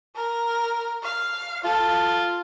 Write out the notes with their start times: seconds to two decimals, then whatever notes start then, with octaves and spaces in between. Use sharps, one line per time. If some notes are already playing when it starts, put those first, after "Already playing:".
0.16 A#4
1.03 F5
1.64 F4 A4